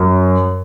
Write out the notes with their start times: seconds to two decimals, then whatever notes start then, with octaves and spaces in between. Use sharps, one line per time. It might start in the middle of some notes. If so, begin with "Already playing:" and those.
Already playing: F#2